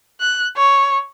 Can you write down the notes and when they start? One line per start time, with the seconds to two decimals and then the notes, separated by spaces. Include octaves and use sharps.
0.20 F#6
0.57 C#5